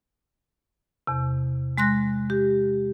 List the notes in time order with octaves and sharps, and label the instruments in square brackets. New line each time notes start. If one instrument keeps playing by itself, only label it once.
[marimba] E2 C3
G#3 C6 F#6 A#6
G4